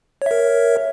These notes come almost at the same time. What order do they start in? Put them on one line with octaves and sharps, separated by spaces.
C#5 E5 A#4